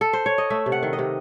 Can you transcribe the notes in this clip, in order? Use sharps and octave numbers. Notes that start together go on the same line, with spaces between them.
A4
C5
C#5
D#5
A3 E5
C3
F#5
D#3
D#5
C3